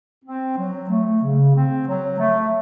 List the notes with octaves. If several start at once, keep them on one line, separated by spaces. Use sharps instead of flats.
C4
F#3
A3
C#3
C4
F#3
A3